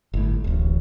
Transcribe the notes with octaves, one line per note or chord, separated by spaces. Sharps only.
G1 A2
D1 A1